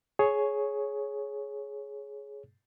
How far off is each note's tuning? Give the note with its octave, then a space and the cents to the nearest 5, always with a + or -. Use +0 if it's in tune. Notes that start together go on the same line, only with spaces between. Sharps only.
G#4 +15 C#5 +0